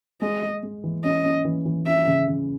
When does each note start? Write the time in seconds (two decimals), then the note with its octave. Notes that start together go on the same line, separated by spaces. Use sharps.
0.22 G#3 D#5
0.43 G#3
0.63 G#3
0.84 E3
1.04 C#4 D#5
1.25 C#4
1.45 E3
1.66 E3
1.87 C#4 E5
2.07 C#3
2.28 C#3